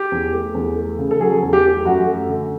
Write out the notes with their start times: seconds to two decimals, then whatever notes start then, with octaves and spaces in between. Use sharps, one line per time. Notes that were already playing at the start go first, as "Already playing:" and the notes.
Already playing: G4
0.12 E2
0.32 A3
0.54 E2
0.76 A3
0.98 C#3
1.11 A4
1.20 F#3 G#4
1.42 E2
1.53 G4
1.64 A3
1.85 F#2 F#4
2.07 A3
2.29 D3